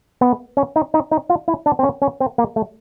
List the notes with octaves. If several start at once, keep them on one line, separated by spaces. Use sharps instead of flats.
B3
C#4
D#4
D#4
D#4
F4
E4
D4
C4
C#4
C#4
C4
A#3
A3